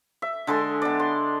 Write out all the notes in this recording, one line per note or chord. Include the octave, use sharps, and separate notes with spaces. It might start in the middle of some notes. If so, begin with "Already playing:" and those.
E5
D3 G#3 A4 C6
B3 D5
C6